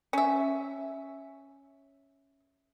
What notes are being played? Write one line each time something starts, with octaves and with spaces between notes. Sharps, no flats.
C#4 E5